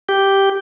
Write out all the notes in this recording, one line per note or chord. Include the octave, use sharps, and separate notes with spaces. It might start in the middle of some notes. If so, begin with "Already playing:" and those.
G4